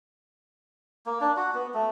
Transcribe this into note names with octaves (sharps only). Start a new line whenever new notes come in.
A#3
D4
F#4
B3
A3